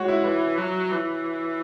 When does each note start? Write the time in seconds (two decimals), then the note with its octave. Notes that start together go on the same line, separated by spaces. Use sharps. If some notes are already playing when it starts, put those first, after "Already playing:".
Already playing: G#3 F#4 C#5
0.08 E4
0.24 E3 B4
0.58 F#3
0.91 E3